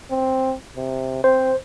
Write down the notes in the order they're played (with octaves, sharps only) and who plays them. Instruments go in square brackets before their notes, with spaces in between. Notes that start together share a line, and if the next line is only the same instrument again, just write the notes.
[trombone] C4
C3
[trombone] C4 [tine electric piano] C5